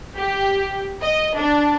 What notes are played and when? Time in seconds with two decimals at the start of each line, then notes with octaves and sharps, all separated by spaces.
0.16 G4
1.03 D#5
1.38 D4